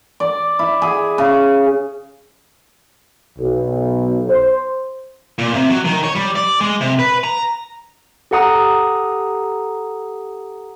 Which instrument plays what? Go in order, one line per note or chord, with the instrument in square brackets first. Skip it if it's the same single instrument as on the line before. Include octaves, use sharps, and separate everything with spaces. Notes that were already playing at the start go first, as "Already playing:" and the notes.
[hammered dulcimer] D5
E4
G#4
C#3
[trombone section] B1
C5
[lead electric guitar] A#2
C3
F#3
D#3
C#5
G3
D5
G#3
C3
B4
A#5
[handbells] G4 A4 F#5 A#5 D#6